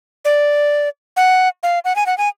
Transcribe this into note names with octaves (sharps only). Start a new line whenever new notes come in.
D5
F#5
F5
F#5
G#5
F#5
G#5